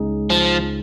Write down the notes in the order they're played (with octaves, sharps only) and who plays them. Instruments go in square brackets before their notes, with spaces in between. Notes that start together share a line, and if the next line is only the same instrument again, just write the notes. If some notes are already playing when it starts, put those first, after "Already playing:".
Already playing: [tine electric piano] C#2 C#3 G#3 D#4 G#4
[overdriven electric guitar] F3